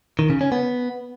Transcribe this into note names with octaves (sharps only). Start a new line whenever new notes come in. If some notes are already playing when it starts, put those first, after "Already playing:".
D#3
C#3
C#4
B3